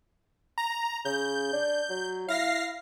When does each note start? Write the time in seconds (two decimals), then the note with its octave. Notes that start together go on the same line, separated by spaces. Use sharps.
0.58 A#5
1.05 C#3 G6
1.53 D4
1.90 F#3
2.28 E4 F5 A#6 C7